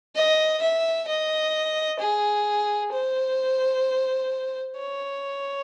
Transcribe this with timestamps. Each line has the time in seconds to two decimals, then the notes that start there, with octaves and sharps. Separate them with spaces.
0.15 D#5
0.62 E5
1.08 D#5
1.99 G#4
2.92 C5
4.77 C#5